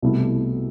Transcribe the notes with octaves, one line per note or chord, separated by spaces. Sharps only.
C2 B2 A3 E4 A4